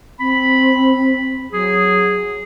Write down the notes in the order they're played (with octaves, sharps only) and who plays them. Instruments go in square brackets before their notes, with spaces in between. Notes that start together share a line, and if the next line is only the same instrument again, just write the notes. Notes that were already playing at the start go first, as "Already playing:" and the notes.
[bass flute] C4 [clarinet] B5
[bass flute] F#3 [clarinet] G#4